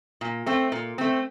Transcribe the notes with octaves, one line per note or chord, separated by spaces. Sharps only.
A#2
A3 C4
A#2
A3 C4